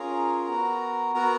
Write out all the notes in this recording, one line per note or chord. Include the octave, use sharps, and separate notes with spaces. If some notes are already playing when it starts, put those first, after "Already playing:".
Already playing: C#4 F4 G#4 A#4 A#5
B3 F#4
B3 F#4 A#4 A#5